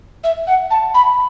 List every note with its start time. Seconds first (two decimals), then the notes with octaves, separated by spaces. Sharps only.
0.24 E5
0.47 F#5
0.71 A5
0.94 B5